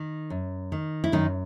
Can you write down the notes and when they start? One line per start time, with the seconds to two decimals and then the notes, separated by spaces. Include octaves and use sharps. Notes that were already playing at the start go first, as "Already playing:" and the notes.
Already playing: D#3
0.30 F#2
0.72 D#3
1.04 E4
1.12 F#2 D#3 D#4